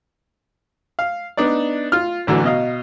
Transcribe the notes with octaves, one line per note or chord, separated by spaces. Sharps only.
F5
B3 D4 D#4 D5
F4 F6
A1 D3 E3 F#3
B2 D#5 F5